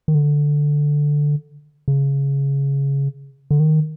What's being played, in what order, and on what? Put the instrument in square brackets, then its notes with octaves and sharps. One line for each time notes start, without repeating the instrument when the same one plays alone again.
[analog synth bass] D#3
D3
C#3
D3
D#3